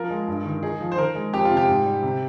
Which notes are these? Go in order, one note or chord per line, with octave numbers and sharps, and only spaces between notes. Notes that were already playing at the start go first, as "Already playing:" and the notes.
Already playing: F3 F4 A#4
G#3
G2
D#3
D#4 G#4
F3
C5
D#3 A#4
G#3
F2 G4
F4
C3
G4
G#2
G3
C3